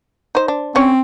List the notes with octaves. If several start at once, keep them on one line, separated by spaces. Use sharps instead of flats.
D#4 C5
D4
D3 C4 C#4 C#5